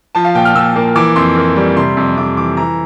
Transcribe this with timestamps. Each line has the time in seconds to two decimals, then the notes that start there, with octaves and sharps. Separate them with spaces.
0.15 F3 A5
0.25 F5
0.35 A#2 G5
0.45 F6
0.55 A#2 E6
0.76 A#3
0.96 E3 D6
1.16 F2 C6
1.36 A#3
1.56 G3
1.77 C3 C6
1.97 F2
2.17 F2 D6
2.37 E3 D6
2.57 E3 A#5